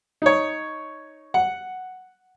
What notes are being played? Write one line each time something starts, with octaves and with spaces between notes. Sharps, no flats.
D#4 C#5
F#5